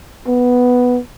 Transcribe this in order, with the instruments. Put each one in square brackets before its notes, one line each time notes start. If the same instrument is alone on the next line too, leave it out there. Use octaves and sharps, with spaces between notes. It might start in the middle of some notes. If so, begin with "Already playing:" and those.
[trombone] B3